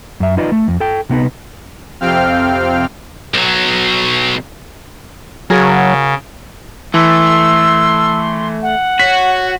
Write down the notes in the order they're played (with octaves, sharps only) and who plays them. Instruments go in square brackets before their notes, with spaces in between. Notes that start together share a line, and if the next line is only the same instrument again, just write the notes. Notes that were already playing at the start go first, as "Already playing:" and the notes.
[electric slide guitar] F#2 E5
D#4 F4 B4 D5 D#5
A3
F2
A4 G5
C3 B3 D#4 B4
[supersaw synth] F2 C3 C4 F5 G5 F6
[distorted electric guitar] B1 F#3
[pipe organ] C#3 [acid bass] F#3 [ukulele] F#4 G#4 A#4
[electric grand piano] E3 [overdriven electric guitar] A3 [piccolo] C6 [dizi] E6
[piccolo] F#5
[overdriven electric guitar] F#4 [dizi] C#5 [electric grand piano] B6